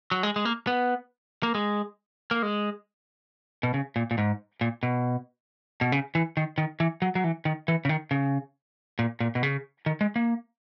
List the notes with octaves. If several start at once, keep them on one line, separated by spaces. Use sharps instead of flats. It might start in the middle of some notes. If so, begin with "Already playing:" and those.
F#3
G#3
G#3
A#3
B3
A#3
G#3
A#3
G#3
B2
C#3
A#2
A#2
G#2
A#2
B2
B2
C#3
E3
D#3
D#3
E3
F#3
F#3
E3
D#3
E3
C#3
D#3
C#3
A#2
A#2
B2
C#3
D#3
G#3
A#3